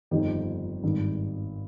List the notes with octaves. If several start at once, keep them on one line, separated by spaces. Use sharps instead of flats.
G1 F2 D#3 D#4 G4
G#1 G2 D#3